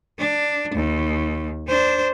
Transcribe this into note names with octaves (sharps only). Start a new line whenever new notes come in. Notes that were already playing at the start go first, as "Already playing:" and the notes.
D4
D#2
D4 C5